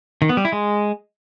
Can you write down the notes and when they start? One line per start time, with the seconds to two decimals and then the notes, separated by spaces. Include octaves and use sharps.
0.22 D#3
0.29 B3
0.37 G3
0.45 E4
0.52 G#3